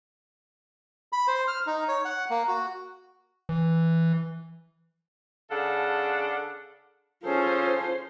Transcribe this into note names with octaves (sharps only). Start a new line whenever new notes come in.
B5
C5
F6
D#4
C#5
F#5
A#3
F#4
E3
C#3 D4 A4 F5 F#5
C#4 F4 G#4 A4 C5